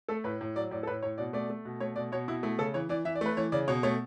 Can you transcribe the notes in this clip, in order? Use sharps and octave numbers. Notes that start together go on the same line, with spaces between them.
A3 A4
A2 B4
A2
F#3 D5
A2 D5
A4
A2 B4
A2 C#5
B2 D5
A3 D5
A3
B2
A3 C#5
B2 D5
B2 C#5
B2 E4
A3 E4
C#3 A4
E3 C#5
E3 D5
E3 E5
D5
A3 B4
E3 C#5
C#3 D5
B2 C#5
A3 C#5